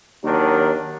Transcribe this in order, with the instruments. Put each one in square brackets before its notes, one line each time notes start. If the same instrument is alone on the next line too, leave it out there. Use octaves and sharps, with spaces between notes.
[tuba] D#2 [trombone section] D#3 F#3 D4